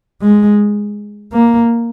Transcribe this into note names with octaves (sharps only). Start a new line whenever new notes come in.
G#3
A#3